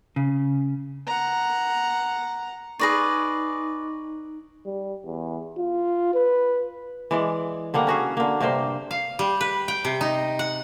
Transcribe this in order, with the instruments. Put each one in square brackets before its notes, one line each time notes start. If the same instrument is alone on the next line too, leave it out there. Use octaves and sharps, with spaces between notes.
[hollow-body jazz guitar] C#3
[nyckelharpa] F#5 A#5
[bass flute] D#4 [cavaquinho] G#4 B4 D5 [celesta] C#6 A#6
[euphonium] G3
E2
F4
B4
[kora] E3 G#3 D5
D3 G3 A#3 F#5
C#4 F#4 G#4
D3 A#3
G2 C3 A#3 C5
[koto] F5
G3
B4
G5
C3
D#4
F#5